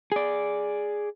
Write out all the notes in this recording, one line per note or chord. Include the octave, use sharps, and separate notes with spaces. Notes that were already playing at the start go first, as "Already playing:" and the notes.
G#4 D5